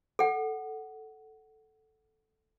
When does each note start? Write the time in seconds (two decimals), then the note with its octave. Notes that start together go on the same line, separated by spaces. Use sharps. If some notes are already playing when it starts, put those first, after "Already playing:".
0.19 A4 F#5